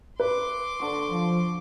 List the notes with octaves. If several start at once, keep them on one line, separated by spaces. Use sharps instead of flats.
B4 C6 D6
D3 C#6
F3